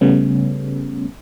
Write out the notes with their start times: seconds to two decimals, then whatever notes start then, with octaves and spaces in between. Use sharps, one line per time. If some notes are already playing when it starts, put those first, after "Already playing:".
0.01 C#3 G3 A3 B3 C#4